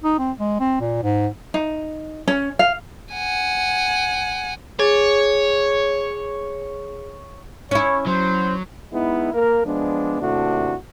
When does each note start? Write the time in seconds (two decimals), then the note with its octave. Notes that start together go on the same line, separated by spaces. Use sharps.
0.04 D#4
0.19 C4
0.39 G#3
0.60 C4
0.80 A#2
1.03 G#2
1.54 D#4
2.28 C#4
2.59 F5
3.14 F#5 G#5
4.79 G#4 C#5
7.71 C#4 E4 C#5
8.07 F#3 C5
8.92 G#3 B3 D#4 E4
9.33 A#3 A#4
9.66 F3 G#3 B3 D4
10.21 D#2 C3 A3 D4 E4 F#4